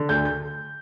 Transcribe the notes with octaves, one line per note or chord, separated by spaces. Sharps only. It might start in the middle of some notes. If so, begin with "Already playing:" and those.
Already playing: D3
D2 G6
G6